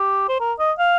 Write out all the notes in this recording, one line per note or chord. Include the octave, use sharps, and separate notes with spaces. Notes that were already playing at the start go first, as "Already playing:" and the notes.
Already playing: G4
C5
A#4
D#5
F5